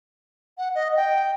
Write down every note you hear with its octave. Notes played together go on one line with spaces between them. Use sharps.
F#5
D#5
G5